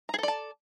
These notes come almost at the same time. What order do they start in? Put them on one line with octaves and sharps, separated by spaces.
A#5 G#4 A4 D5 A5